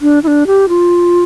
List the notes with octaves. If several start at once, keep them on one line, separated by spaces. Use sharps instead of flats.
D4
E4
D4
G4
F4